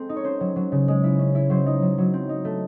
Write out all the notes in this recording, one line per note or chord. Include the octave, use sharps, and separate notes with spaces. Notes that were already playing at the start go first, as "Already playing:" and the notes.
Already playing: G#3 C4 A4
D#4
C#5
C#4 C5
F#3
F#3
C#3
G#3
E4
C#4
E4
F#3 C5
D#4
F#3
F#3
C4
D#4
A3